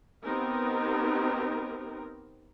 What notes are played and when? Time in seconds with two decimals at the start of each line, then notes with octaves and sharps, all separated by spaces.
0.24 B3 C4 D#4 G4 A#4